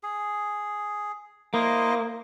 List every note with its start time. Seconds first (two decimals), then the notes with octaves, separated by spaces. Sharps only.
0.03 G#4
1.54 A#3 E4 C5 D#5